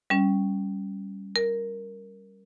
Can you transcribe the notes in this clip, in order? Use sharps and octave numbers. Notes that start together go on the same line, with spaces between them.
G3 C#4
A#4